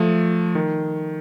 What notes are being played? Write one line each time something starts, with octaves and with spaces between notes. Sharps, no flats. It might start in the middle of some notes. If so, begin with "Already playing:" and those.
Already playing: F3 A3
D#3